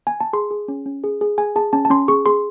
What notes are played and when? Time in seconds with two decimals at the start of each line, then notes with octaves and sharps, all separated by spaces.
0.07 G#5
0.20 A5
0.33 G#4 C6
0.51 G#4
0.68 C#4
0.86 C#4
1.04 G#4
1.21 G#4
1.38 G#4 G#5
1.56 G#4 A5
1.73 C#4 A5
1.85 A5
1.90 C#4 C6
2.08 G#4 C#6
2.26 G#4 C6